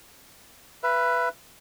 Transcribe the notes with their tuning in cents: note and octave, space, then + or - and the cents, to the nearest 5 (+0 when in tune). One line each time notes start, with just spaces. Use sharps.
B4 +0 E5 +35